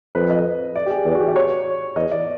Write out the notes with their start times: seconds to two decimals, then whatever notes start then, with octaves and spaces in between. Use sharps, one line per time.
0.15 F2 B4
0.30 D#5
0.76 D5
0.86 G4
0.90 G#4
1.05 E2 G#4
1.15 F#4
1.20 G4
1.28 D5
1.36 C#5
1.96 E2 D#5
2.11 D5